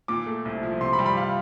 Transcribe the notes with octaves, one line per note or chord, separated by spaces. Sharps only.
A#2 D6
A3
C2
F3
C3 C6
B5
G3
B5
F5